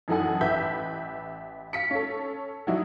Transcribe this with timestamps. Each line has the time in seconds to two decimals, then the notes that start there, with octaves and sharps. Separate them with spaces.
0.08 F#2 E3 D#4 A4 F#5 G#5
0.41 A1 B4 E5 G6 B6
1.73 F5 B6 C#7
1.91 C#4 A4
2.67 F#3 G3 D#4 E4 F#4